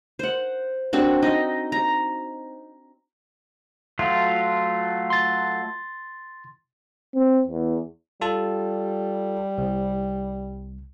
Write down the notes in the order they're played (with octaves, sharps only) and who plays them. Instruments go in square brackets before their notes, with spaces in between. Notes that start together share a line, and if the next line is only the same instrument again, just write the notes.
[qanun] C5 F#5
C4 D4 F#4
D#4 D#5
A#5
[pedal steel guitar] F#3 A3 F4
[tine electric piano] C6 A6
[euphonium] C4
E2
[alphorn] G3 [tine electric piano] F4 A4 A5
[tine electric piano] C2